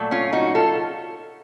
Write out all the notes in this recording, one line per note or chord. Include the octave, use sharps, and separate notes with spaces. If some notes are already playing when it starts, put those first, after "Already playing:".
Already playing: A#2 F#3 A3
C#4 F4
D#4 F#4
F4 A4